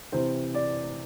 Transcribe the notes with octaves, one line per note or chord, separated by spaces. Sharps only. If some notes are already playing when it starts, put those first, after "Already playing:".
C3 E3 C5
D5